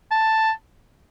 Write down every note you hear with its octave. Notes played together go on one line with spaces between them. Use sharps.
A5